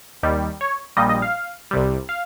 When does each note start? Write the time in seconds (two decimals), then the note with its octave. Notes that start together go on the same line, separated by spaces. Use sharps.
0.23 D#2 D#3 G3
0.61 C#5
0.97 A#1 A#2 G3 D#5
1.09 D#5
1.22 F5
1.71 C2 C3 G3
2.09 F5